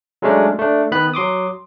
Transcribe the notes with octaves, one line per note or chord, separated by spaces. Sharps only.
F#3 G#3 A3 C#4 D4
A3 D4
D#3 B3 B4 B5 F#6
F#3 C6 D6 D#6